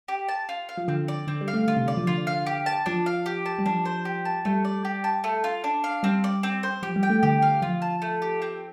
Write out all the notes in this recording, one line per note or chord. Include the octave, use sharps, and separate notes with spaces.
G4
A5
F4
F5
F3
D3 C4
D5
D3 C4
G3
F5
A3
D3 F4
C3
D3 D5
F3
D3 F4
F5
G4
A5
F3 D4
F5
G4
A5
G3
F3 D4
C5
G4
A5
G3 A3
D5
G4
A5
A3
F4
D4
F5
G3 C4
D5
C4
C5
F3 G4
G3
G5
A3
D3 G4
F5
F3 F4
A5
A3
G4
C4